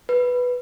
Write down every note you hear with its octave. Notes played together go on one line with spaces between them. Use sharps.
B4